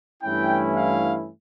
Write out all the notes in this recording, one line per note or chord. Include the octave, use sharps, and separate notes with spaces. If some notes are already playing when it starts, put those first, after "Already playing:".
G2 E3 A3 C#4 E4 G5
F5